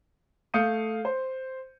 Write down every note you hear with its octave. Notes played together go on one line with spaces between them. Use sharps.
A3 F5 D#6 G6 C#7 D#7
C5